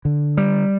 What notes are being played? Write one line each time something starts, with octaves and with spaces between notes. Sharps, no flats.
D3
G3